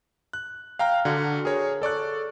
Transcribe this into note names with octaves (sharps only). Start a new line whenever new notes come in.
F#6
F5 G5 A#5 F6
D3 F#4
G#4 A#4 C#5
A4 D5 C#6 F#6